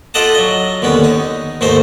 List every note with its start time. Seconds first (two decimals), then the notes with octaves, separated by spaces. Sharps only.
0.14 F4 G4 A4 D#5 F#5 A5
0.35 F#3 D#5
0.82 D#2 D3 B3 C#4
1.04 D#4
1.61 D#2 G#2 A3 D#4 C5